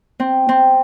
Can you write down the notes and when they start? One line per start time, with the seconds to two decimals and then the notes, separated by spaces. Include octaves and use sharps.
0.20 C4
0.49 C4